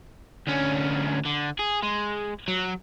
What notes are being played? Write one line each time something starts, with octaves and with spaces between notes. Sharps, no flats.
D2 C#4
D3
G#4
G#3
F#3